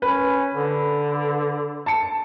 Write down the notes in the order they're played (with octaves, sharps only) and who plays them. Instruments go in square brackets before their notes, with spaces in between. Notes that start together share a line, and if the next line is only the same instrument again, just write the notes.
[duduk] C#4 [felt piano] B4
[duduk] D3
[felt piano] A5 C#7